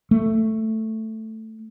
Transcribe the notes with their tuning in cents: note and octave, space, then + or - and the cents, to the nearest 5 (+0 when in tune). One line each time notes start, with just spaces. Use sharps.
A3 +5